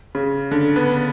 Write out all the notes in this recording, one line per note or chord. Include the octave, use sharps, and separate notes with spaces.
C#3
D3
B3